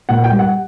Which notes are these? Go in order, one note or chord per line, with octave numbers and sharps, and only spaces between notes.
A#2 F#5
G5
G3
F#5